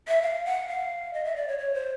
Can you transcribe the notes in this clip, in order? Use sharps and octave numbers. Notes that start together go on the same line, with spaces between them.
E5
F5
F#5
F5
D#5
E5
D5
C#5
C#5
C5